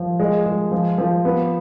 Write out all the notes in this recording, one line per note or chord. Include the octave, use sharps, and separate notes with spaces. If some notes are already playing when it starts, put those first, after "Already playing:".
Already playing: F3
G#3
G#3
F3
F3
B3